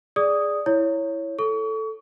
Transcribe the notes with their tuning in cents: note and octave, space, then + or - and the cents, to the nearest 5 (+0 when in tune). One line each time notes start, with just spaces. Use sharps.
G#4 +0 D5 +0 D#6 +0
E4 +0 C#5 +0
A4 +0 C#6 +35